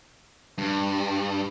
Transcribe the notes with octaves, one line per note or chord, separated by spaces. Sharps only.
G2